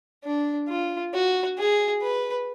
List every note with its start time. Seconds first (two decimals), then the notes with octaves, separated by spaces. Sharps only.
0.24 D4
0.68 F4
1.14 F#4
1.58 G#4
2.02 B4